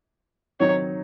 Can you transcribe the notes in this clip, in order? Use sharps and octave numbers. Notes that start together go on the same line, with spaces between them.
D#3 F#3 C4 D#4 C#5